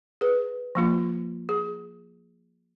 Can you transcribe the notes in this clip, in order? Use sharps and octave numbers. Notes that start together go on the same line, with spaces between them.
G#4 B4
F3 A#3 F4
G#4